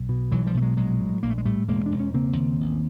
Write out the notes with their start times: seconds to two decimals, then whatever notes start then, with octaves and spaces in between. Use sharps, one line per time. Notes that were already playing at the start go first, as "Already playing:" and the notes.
Already playing: B1
0.09 B2
0.32 B1 E3 F#3
0.47 F3 G3
0.54 B2 A3
0.62 F#3 G#3
0.77 A#1 F#3 G#3
1.00 A2
1.23 A#1 A#3
1.30 A3
1.38 G#3
1.45 A2 G3 A3
1.68 E1 G#3 A#3
1.86 E1 D4
2.00 C#4
2.14 C#3 A#3 C4
2.37 D#2
2.60 A1